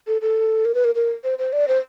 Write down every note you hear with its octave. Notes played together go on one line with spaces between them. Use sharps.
A4
A4
A#4
B4
A#4
A#4
C5
C5
D5
C5